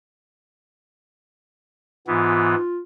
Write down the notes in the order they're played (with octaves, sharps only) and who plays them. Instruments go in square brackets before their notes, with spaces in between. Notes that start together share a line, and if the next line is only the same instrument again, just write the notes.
[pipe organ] G#2 E3 B3 [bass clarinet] F4